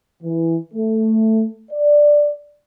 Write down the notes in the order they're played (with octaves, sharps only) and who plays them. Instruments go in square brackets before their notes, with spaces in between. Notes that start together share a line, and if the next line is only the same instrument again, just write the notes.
[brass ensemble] E3
A3
D5